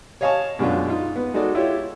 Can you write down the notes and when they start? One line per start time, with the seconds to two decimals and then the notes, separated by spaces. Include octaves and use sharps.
0.21 C#5 D#5 F5 G#5 A5 C#6
0.59 F#2 B2 G#3 D4 F4
0.88 D#4 F4
1.16 B3
1.34 G#3 D#4 F#4 A4 D5
1.55 E4 F4 G4 C#5